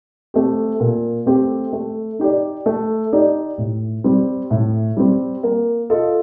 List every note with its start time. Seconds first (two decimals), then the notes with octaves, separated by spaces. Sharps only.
0.34 A3 C4 G4
0.80 A#2
1.26 A3 C4 G4
1.73 A3
2.19 D#4 G4 D5
2.66 A3
3.13 D#4 G4 D5
3.58 A2
4.04 G3 C4
4.51 A2
4.97 G3 C4
5.43 A#3
5.90 F4 A4 D#5